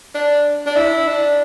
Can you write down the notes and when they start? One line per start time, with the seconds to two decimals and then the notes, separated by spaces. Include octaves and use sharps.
0.15 D4
0.67 D4
0.76 E4
1.08 D4